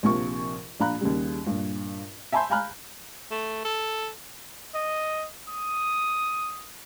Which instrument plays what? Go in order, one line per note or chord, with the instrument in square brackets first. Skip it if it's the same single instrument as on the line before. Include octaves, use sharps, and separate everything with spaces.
[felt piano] A#1 C3 F3 A#4 C#6
A#1 D4 F5 A#5 B5 F#6
D#2 C#3 G3
G2 A#2
E5 G#5 A5 B5 C6 G6
F5 G#5 A#5 B5 F6 F#6
[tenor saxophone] A3
A4
[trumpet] D#5
D#6